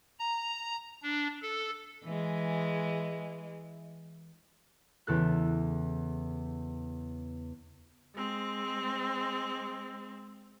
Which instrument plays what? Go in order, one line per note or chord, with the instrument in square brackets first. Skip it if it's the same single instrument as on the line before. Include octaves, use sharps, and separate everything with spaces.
[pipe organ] A#5
D4
A4
[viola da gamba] E3 G#3
[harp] E2 C#3 A4 F#6
[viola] G#3 C4